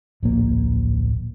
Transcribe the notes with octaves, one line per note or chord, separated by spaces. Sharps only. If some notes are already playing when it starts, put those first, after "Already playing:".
D1 A#1 A#3